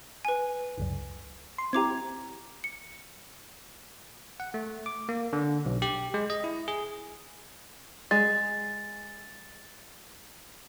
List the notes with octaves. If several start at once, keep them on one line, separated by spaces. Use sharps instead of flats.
B4 G#5
G1 C#2 F#2
C6
C4 E4 G4 A#5 D6 G#6
C#7
F#5
A3
D6
A#3
D3
B1
G4
G#3
D#5
E4
G#4
G#3 A6